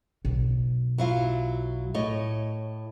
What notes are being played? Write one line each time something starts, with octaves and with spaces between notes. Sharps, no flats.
B1
F#3 E4 F4
A2 C#5 D#5